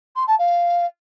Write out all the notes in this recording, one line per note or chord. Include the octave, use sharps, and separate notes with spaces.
C6
A5
F5